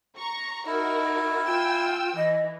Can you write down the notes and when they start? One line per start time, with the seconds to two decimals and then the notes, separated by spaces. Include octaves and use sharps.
0.17 A#5 C#6
0.66 D#4 E4 F#4 A#4
1.46 F4 G5 G#5 E6
2.16 E3 D#5